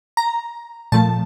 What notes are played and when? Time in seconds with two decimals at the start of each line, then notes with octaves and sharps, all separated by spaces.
0.17 A#5
0.92 A#2 F3 A3 A5